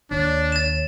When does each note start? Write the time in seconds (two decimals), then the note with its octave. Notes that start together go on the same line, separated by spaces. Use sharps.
0.11 D#2 D4 C#5
0.52 A6 E7